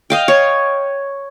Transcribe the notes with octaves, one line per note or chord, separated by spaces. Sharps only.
D#5 F5 G5
C#5